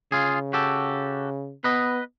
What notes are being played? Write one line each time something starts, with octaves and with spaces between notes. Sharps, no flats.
C#3 F4 G#4
F#4 G4 A4
B3 B4 D#5